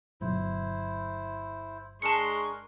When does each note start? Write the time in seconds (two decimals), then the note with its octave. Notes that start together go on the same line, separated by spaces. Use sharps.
0.21 G1 B2 F#3 E4 C5
2.02 G#3 D4 G#4 A#4 A5 C6 C#6 C#7